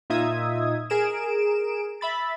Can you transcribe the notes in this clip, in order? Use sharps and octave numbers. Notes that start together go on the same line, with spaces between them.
A#2 D#4 F4 E5 D#6 G#6
G#4 A#4 D7 E7
E5 B5 A6